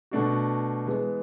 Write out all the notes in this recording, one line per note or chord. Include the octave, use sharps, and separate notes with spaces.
B2 A3 D4 F#4
E3 G#3 B3